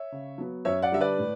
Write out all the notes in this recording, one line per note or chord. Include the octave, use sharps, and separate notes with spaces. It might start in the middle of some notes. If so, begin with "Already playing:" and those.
Already playing: C#5 E5
C#3
F#3 B3
F#2 C#5 E5
D5 F#5
D3 G3 E5
B4 D5
A2